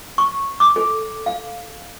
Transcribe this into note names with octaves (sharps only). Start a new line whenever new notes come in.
C#6
D6
A4
F5